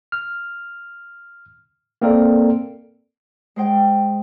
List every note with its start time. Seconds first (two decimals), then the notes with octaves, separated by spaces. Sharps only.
0.12 F6
2.02 A#3 C4 A4 A#4 D5
3.56 G#3 C5 G5